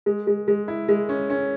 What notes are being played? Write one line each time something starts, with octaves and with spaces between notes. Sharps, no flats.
G#3
G#3
G#3
E4
G#3
C#4
C#4